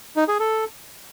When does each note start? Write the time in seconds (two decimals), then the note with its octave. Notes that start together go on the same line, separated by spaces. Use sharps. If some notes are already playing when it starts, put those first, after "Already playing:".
0.16 D#4
0.28 G#4
0.40 A4